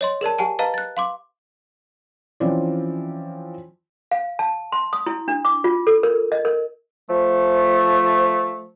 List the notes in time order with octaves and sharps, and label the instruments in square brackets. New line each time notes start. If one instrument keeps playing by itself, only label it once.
[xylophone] C#5 D#5 C6
G#4 A#4 D5 A5
G4 F#5 G#5 A5
B4 D#5 F5 A5 A#5
F#6 A6
F5 C6 D6
[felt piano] E3 F3 C4 C#4 F4 D5
[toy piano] F5
A5
C6
D#6
E4
D4
D6
F4
A4
A#4
D#5
A#4
[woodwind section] F3 A3